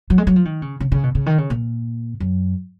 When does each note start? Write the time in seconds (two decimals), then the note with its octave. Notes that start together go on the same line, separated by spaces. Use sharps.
0.10 F#3
0.18 G#3
0.27 F#3
0.36 F3
0.45 D#3
0.62 C#3
0.80 C#3
0.92 C#3
1.03 B2
1.15 C#3
1.26 D#3
1.38 C#3
1.50 A#2
2.20 F#2